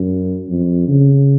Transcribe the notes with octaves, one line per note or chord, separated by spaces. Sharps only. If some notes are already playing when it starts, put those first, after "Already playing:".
Already playing: F#2
F2
C#3